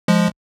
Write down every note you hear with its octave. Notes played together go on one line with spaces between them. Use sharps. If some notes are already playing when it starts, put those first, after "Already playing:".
F3 G#3